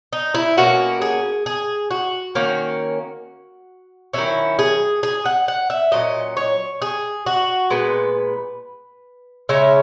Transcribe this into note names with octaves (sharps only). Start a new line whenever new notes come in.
D#4
E4
B2 A#3 C#4 F#4
G#4
G#4
F#4
D#3 A#3 C#4
D#3 F#3 C#4 E4
G#4
G#4
F#5
F#5
E5
A#2 F#3 C#4 D#5
C#5
G#4
F#4
A#2 G#3 B3 B4
C#3 G#3 C#4 E5